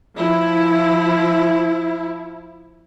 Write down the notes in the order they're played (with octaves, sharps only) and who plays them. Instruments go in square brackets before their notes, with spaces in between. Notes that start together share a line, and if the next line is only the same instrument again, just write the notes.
[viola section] F3 E4